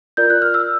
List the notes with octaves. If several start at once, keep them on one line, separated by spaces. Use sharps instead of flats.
F4 A#4 D5 G6
F#6
F6
E6